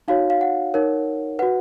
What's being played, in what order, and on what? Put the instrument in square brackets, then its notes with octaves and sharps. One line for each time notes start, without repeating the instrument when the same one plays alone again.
[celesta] D#4 F#4 C#5 F5
F5
F#5
D#4 A#4 C#5
F#4 B4 F#5